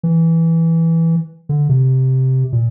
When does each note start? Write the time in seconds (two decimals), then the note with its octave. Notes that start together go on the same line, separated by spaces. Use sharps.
0.03 E3
1.49 D3
1.69 C3
2.52 A#2